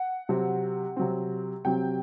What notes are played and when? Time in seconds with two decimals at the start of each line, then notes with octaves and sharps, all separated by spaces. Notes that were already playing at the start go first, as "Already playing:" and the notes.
Already playing: F#5
0.29 C3 F#3 C4
0.96 C3 F#3 C4
1.65 C3 F#3 C4 G5